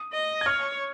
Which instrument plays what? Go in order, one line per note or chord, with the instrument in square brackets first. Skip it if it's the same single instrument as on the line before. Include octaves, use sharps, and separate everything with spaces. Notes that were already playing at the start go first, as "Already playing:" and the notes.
Already playing: [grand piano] D#6
[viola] D#5
[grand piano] G#6
[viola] C#5 [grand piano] F6